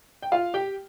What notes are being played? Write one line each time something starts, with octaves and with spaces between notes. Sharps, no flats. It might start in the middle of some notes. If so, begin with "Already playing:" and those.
G5
F4 F5
G4 G5